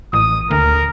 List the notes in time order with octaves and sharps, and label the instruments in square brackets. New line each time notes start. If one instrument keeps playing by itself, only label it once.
[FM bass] A1 [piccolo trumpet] D#6
[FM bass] D2 [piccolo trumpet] A#4